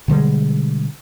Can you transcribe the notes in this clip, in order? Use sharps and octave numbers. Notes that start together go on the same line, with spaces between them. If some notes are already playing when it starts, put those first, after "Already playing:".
B2 D3 G3 G#3